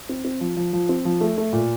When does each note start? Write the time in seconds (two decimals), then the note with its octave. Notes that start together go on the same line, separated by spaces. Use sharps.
0.09 C4
0.25 C4
0.41 F3
0.57 F3
0.73 F3
0.89 C4
1.05 F3
1.21 A3
1.38 A3
1.53 A#2